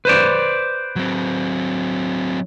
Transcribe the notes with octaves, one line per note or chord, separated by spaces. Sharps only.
B4 C5 D5
F#3 C4